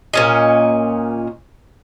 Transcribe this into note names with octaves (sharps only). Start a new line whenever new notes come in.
A#2 C#4 D#5